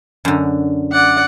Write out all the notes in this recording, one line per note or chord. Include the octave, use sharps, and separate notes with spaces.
F#2 D3
D5 F#5